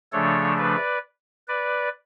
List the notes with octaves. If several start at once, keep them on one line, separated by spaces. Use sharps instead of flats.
C#3 F3 A3 D4 A4 C#5
B4 D5
B4 D5